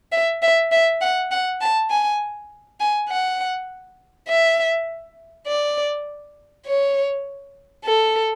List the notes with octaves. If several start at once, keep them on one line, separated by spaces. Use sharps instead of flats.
E5
E5
E5
F#5
F#5
A5
G#5
G#5
F#5
E5
D5
C#5
A4